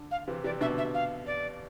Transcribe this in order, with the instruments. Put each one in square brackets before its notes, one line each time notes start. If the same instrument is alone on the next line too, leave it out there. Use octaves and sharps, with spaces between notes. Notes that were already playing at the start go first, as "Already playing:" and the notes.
Already playing: [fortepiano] D3
[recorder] F5
[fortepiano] C3 E3
[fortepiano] C3 E3 [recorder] D5
[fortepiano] B2 D3 [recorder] E5
[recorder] E5
F5
D5